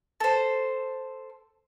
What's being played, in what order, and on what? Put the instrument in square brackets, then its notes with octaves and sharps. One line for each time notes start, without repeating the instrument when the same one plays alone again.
[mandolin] A4 C5